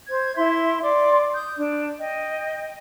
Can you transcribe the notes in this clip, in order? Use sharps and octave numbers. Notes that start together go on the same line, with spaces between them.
C5 G#6
E4 E5 C6
D5 C6 D6
D#6 G6
D4
D#5 G5